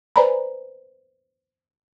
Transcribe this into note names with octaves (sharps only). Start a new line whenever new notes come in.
B4 C5 D5 G#5 A#5 B5